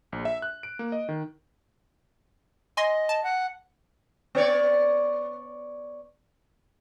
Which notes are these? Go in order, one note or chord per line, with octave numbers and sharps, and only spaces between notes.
A#1
E5
F#6
D7
A#3
D#5
D#3
D#5 G#5 C6 A#6
A5
F#5
B3 C#5 D5